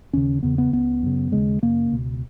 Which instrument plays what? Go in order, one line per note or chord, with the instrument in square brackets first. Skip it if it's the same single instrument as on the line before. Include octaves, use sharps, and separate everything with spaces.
[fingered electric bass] D#2 C#3 C#4
E2 C#3 B3
B3
C#2 C#3 B3
F#2 C#3
D#2 C#3 G#3
F#2 C#3 A#3
C#2 B2